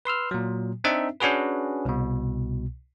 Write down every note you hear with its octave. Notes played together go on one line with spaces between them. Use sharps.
B4 C6 E6 F6
A#2 F#3
C4 D4 D#4 E5
C#4 D4 F#4 G#4 B4
C2 B2